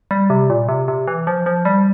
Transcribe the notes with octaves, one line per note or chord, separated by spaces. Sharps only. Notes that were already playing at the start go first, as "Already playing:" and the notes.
G3
C3
A#2
C3
C3
E3
F3
F3
G3